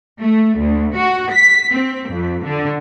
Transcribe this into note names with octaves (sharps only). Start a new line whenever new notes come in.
A3
D2
F#4
B6
C4
F2
D3